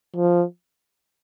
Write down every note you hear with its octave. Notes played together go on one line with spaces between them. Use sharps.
F3